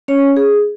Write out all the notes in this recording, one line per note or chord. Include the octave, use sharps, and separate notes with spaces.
C#4 C#5
G#4